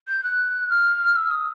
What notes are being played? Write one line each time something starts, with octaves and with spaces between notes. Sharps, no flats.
G6
F#6
F6
E6
D#6